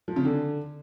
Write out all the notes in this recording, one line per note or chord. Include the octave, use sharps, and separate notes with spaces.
F3
C#3
D3